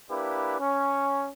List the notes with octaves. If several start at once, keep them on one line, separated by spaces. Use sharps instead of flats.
A#3 D4 E4 G4 B4
C#4